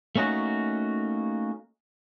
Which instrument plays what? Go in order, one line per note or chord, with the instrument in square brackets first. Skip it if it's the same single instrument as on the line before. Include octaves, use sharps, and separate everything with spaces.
[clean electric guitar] A3 A#3 C#4 D#4 F#4